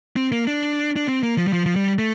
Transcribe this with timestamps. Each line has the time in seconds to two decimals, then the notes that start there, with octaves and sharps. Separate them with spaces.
0.16 C4
0.32 A#3
0.47 D4
0.96 D4
1.08 C4
1.23 A#3
1.38 F3
1.47 G3
1.53 F3
1.66 F3
1.76 G3
1.99 A3